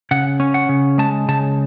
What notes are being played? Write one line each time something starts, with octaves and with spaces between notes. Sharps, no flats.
C#3 F#5
C#4
F#5
C#3
G#3 A5
C#3 A5